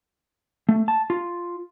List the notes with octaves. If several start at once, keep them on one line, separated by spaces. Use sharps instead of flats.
A3
A5
F4